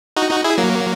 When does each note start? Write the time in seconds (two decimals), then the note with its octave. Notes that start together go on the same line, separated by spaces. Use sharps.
0.17 D#4 F#4
0.31 D#4 F#4
0.44 E4 G#4
0.58 F#3 A#3